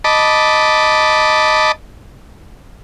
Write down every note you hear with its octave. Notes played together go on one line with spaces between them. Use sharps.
D#5 A5 B5 D6